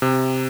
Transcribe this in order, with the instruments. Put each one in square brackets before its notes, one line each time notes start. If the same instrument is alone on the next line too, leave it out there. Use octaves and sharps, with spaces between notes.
[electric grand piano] C3